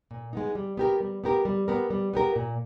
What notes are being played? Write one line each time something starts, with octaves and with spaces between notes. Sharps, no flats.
A#2
G#3 B3 D#4
G3
B3 G4 A#4
G3
B3 G4 A#4
G3
B3 G4 A#4
G3
B3 G4 A#4
A#2